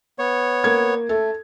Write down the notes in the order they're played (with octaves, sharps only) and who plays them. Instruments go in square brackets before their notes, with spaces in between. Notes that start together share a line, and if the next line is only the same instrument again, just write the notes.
[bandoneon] B3 C#5
[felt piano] A#3 G#6
[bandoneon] A3 [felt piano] A4